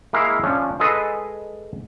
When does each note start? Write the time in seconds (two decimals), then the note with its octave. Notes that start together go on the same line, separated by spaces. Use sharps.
0.13 G#3 A#3 E4 F5
0.43 F3 C#4 D4
0.80 G#3 G#4 A4 B4 D#5